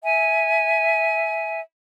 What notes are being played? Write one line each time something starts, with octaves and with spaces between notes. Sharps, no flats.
E5 G#5